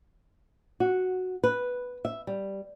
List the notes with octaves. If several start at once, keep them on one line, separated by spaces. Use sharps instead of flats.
F#4
B4
E5
G3